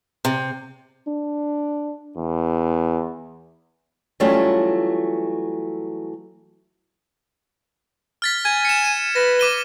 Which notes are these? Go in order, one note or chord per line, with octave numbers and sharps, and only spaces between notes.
C3
D4
E2
E3 F#3 G3 A3 C#4 F4
F6 A6 B6
G#5 G#6
C#7 E7
D#7
B4 A#6
D6 D#7 G7